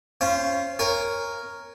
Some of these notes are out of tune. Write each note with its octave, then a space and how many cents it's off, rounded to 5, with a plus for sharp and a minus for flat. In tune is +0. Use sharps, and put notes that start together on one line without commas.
C#4 +0 F4 -30 C5 +0
A#4 +0 C#5 +0 G#5 -30